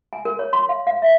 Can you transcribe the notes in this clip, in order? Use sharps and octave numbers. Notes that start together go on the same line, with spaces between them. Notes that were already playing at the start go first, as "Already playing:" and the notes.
G#5
A#4
C#5
C6
F5
F5
E5